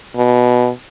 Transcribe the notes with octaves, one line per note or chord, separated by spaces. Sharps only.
B2